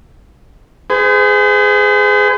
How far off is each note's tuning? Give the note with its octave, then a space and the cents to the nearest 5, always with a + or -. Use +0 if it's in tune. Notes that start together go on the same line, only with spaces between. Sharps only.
G#4 +0 C5 -45